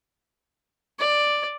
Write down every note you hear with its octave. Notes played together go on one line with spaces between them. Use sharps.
D5